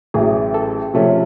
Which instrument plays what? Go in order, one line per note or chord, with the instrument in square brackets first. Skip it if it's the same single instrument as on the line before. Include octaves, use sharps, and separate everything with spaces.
[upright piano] A1 A2 F#3 [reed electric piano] G#4
[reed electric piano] A4
[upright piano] C3 F3 A3 C#4 [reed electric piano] A4